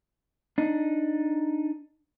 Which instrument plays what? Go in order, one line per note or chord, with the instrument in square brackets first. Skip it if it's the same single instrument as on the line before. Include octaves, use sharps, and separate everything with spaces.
[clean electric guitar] D4 D#4